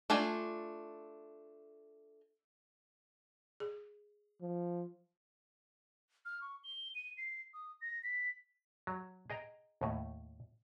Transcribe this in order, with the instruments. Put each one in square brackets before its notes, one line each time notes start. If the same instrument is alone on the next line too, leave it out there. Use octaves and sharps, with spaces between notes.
[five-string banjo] A3 D4 F4 G#5
[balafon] G#4
[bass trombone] F3
[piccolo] F6
C#6
G7
D#7
C7
D#6
A#6
B6
[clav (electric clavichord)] F#3
G#4 D#5 G5 A#5
D#2 A2